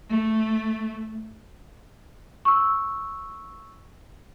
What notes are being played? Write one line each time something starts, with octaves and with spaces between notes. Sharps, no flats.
A3
C#6 E6